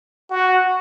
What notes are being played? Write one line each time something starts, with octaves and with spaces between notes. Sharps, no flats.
F#4